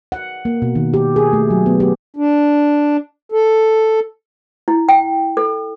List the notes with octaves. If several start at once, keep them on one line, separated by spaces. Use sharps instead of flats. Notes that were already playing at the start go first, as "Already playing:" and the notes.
F#5
A#3
B2
D#3
G4
G#4
A3
F#3
B3
G4
D4
A4
E4
G5
A4